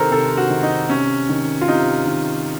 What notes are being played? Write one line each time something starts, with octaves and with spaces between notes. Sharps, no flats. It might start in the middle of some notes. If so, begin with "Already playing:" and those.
Already playing: C3 D#3 A4 A#4 C5
C3 A4
F#4
D#3
D#4
C3 C#4
D#3
F4
C3 D#4
D#3